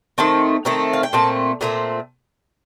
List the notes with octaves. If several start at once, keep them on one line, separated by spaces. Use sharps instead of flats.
D#3 A3 C4 A5
D#3 A3 C4 A#5
F5
G5
A#2 A3 C4 A5
A#2 A3 C4 A#5